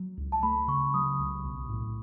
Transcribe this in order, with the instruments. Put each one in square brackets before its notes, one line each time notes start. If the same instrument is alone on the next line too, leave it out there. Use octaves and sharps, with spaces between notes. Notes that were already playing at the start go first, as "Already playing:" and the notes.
Already playing: [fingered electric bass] F#3
C#2
[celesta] A5
[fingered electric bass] A3 [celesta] B5
[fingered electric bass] C#3 [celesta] C#6
[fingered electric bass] F#3 [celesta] D#6
[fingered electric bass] C#2
B1
A2